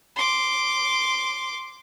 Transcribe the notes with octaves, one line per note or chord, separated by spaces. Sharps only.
C6 D6